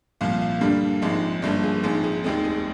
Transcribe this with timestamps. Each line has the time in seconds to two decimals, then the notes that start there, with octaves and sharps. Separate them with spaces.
0.21 C2 A#2 F3 F5
0.41 F5
0.61 G2 D3 G3 A#3
1.02 A#1 G#2 F3 G#3 C4
1.42 G1 G2 F3 A#3 D5
1.63 G#4
1.83 A#1 G#2 F3 C4 G#4
2.04 G#4
2.24 F1 D#2 D#3 G#3 C4 G#4
2.44 G#4